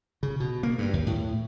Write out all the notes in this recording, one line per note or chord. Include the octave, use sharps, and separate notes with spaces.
C#3
B2
A#3
G2
D#2
A2